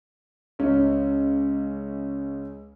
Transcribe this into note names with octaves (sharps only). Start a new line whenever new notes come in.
C#2 C#4